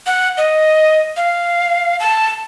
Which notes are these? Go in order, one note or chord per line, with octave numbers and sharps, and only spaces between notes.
F#5
D#5
F5
A5